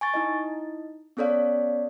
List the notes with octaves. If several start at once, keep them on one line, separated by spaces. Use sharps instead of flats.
G#5 C#6 A6
D#4 E4 D#5
B3 C#4 A4 C#5 D5 F5